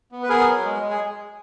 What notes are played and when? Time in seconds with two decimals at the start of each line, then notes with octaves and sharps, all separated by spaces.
0.12 B3
0.23 B4
0.29 B3 G#4 A#4
0.47 F#3
0.64 G#3
0.82 G#3
0.90 G#4